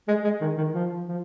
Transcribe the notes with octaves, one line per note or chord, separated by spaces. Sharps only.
G#3
G#3
D#3
D#3
F3
F3